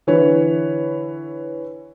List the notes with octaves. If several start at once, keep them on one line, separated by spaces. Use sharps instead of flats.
D3 E3 B4 C#5